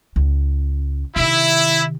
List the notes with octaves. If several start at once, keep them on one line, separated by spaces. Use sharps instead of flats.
C#2
C3 D#3 E4